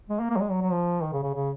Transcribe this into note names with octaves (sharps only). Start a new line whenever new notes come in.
G#3
A#3
A#3
F#3
G#3
F#3
F#3
F3
D#3
C#3
C#3
C#3